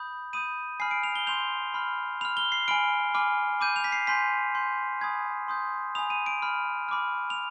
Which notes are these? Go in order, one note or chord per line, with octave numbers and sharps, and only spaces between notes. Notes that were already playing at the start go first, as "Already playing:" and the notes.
Already playing: B5 D#6 G6
B5 D#6 G6 D#7
G#5 B5 F6 C7
D7
F7
G7
C6 G6 F7
B5 F6
B5 F6 F7
G7
C7
G#5 B5 F6 D7
G#5 B5 D6 F6
B5 D6 G6 D#7
F7
B6
C7
G#5 C6 G6 B6
C6 G6
G#5 B5 D#6 G#6
C6 D#6 G6
G#5 B5 D#6 F7
D#7
D7
B5 F6
B5 D6 F6
F7